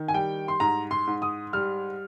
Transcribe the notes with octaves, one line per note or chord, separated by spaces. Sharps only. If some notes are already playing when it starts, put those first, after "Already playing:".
Already playing: D#3
G#5
G3 G5
C6
G#2 A#5
C6
G#2
D#6
G3 F6